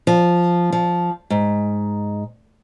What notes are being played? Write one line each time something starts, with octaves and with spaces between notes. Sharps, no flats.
F3
F3
G#2